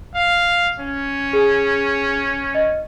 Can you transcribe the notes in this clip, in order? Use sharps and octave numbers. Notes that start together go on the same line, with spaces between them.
F5
C#4
G#4 G#5
D#5